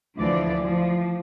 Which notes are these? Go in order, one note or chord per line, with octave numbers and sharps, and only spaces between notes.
D2 E3 F3 D5
F3